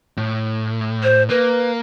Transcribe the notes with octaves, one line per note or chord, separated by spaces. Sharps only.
A2
C5
A#3 B4